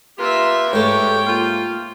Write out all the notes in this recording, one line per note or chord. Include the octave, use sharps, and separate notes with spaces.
A#3 F4 G4 B4 E5
G#2 A3 A4 C#5 G5
A#3 F4